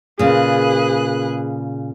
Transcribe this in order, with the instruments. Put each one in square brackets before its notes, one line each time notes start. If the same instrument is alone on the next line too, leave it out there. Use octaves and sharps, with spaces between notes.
[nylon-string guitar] A#2 C#3 [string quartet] G#4 B4 F#6